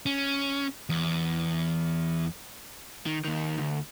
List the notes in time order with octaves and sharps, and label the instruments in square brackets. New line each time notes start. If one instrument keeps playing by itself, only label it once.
[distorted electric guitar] C#4
E2
[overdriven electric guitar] D#3
D#2 D#3
D2